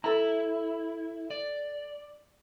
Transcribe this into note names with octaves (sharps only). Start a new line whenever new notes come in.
E4 A4 A#5
D5